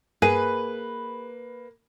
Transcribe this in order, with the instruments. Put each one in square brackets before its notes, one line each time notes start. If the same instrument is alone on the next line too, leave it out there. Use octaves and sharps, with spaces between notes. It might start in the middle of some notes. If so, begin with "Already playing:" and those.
[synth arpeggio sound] G2 [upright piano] A#3 [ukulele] G#4 [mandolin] B4